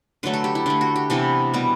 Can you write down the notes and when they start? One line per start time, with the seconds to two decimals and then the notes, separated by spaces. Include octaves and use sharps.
0.23 D3 F#3 A3 B4
0.33 A4
0.44 G4
0.55 E4
0.66 D3 A3 D4
0.81 F#4
0.96 G4
1.10 C3 E3 B3 A4
1.54 B2 G3 B3